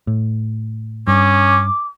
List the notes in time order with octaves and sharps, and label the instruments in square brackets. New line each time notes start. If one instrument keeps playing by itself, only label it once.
[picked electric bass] A2
[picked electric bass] G2 [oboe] C#4 [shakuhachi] D6